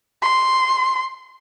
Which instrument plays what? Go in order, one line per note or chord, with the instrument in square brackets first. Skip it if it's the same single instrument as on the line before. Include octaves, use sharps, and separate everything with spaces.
[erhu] C6